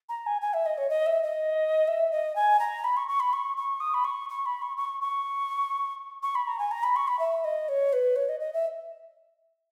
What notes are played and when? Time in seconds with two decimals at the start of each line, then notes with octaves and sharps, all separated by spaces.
0.09 A#5
0.26 G#5
0.41 G#5
0.54 E5
0.66 D#5
0.78 C#5
0.90 D#5
1.06 E5
1.23 D#5
1.88 E5
2.12 D#5
2.36 G#5
2.59 A#5
2.84 B5
2.97 C#6
3.08 C#6
3.20 B5
3.33 C#6
3.57 C#6
3.80 D#6
3.94 B5
4.04 C#6
4.29 C#6
4.46 B5
4.62 C#6
4.77 C#6
5.01 C#6
6.23 C#6
6.35 B5
6.47 A#5
6.59 G#5
6.71 A#5
6.83 B5
6.96 C#6
7.08 B5
7.19 E5
7.44 D#5
7.69 C#5
7.93 B4
8.16 C#5
8.29 D#5
8.40 D#5
8.53 E5